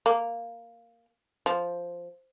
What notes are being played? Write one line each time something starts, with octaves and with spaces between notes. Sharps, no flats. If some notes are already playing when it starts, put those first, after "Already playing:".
A#3
F3